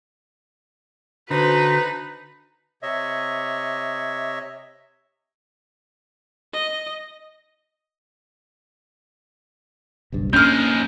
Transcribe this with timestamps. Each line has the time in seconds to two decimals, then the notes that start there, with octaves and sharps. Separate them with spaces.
1.30 D3 D#4 F#4 B4 C5
2.83 C3 C#5 D#5 E5
6.53 D#5
10.12 F#1 B1 G2
10.33 D#2 G#3 A#3 C#4 D4 F6 G6